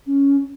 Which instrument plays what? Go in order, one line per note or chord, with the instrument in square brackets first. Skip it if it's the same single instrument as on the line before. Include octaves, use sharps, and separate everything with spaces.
[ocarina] C#4